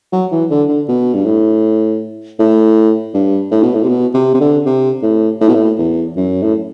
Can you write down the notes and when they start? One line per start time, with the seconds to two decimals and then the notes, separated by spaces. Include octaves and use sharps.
0.13 F#3
0.32 E3
0.50 D3
0.69 D3
0.88 B2
1.14 G2
1.26 A2
2.39 A2
3.14 G2
3.51 A2
3.63 B2
3.74 A2
3.83 C3
3.89 B2
4.14 C3
4.34 C3
4.40 D3
4.66 C3
5.03 A2
5.41 A2
5.48 B2
5.55 A2
5.78 E2
6.17 F#2
6.42 A2